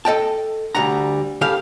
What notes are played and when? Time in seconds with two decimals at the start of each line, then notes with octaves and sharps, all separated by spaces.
0.05 A4 D#5 G5 A5
0.75 D2 G3 F#5 A#5
1.41 C#3 G4 A4 F5